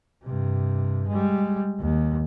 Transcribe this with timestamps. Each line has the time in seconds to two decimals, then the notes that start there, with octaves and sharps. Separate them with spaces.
0.25 G2 C3
1.08 G3 G#3
1.80 D#2